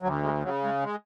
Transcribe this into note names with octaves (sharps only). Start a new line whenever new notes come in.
D2 F#3
G#3
C#3 F#3
G#3
G#3